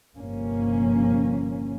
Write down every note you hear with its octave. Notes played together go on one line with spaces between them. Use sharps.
G1 C3 F3 A#3 C#4